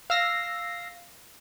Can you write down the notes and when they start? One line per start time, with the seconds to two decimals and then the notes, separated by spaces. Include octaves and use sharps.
0.10 F5 E6 A#6 C7